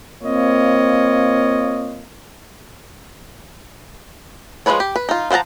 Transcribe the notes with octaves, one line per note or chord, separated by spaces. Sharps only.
A#3 C4 F4 C#5 D#5
F3 G#3 G#4 B4 C#5
G4
B4
D#4 F4
F3 C5 F#5 A5 A#5